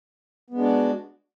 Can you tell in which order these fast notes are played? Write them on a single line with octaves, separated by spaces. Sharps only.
B3 G#3 D4 F#4